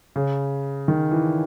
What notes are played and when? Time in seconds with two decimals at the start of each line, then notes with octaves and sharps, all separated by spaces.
0.16 C#3
0.88 D#3
1.12 E3